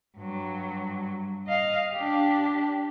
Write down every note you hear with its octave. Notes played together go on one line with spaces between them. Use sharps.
G2 F#3
D#5 F5
D4 G4